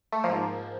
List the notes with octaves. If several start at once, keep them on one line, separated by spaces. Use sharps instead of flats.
A3
G#2 F3 A#3